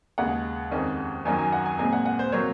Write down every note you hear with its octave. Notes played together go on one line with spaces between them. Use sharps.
D#2 C#3 G#3 F#5
F2 D#3 G#3 C#4
F#2 D#3 F#3 C#4 G#5
G#5
F#5
G#5
A#2 G#3 C4 G#5
F#5
F#5
C5
C3 F#3 A#3 C#5